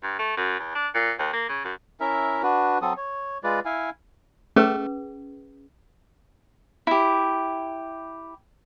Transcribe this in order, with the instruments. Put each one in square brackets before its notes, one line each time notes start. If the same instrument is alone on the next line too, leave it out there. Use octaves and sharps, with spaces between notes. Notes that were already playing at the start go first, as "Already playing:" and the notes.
[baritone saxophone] G2
A3
F#2
E2
D4
A#2
D#2
A#3
C#3
F#2
[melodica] C#4 E4 A#4 E5
D4 F#4 B4
F#3 C4 A4 D#6
C#5
G#3 F4 B4 D5
E4 F5 G#5
[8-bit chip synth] A3 [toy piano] C#4 G#4 B4
[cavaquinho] E4 G4